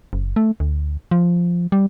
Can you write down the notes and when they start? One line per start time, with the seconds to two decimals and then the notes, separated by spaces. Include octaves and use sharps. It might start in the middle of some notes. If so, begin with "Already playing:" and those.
0.13 F#1
0.36 A3
0.60 D2
1.11 F3
1.72 G3